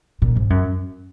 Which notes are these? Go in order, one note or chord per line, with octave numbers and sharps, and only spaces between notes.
A#2
G#2
F#2